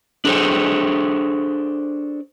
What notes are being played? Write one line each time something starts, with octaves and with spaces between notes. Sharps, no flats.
D4 G#4 A4 C5